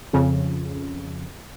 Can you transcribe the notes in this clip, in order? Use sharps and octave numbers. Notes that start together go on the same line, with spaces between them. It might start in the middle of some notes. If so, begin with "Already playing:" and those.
F2 C#3